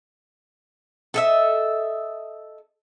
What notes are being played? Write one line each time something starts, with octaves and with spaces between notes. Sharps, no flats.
A4 D#5 E5